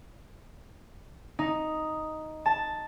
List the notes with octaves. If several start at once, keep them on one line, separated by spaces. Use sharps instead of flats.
D#4
A5